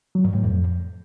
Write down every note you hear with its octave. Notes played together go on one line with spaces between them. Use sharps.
F#3
G2
A2
F2